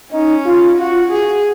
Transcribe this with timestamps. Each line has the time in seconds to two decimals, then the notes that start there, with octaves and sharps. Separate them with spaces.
0.12 C#4 D#4
0.45 F4
0.78 F4 F#4
1.11 F#4 G#4